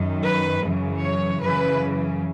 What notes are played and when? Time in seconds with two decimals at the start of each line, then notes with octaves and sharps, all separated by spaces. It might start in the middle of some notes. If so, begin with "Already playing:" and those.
Already playing: F#2 D#3
0.23 B4
0.63 F#2 C#3 E3
1.02 C#5
1.42 F#2 C#3 E3 B4